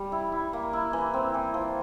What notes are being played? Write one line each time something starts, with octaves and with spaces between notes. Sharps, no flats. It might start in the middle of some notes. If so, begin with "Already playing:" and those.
Already playing: G3
E4
E4
A#3
E4
E3
C4
E3
F3